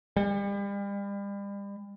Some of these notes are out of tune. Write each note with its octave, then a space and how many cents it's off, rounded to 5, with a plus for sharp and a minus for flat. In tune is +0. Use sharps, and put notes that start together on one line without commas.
G3 +40